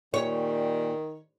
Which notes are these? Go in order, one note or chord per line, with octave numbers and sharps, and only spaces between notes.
A#2 D#3 G3 C#5